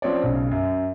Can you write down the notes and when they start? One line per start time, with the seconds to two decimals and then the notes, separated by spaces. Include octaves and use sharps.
0.02 F3 C4 C#4 C#5 D5
0.24 B1 C#3
0.51 F#2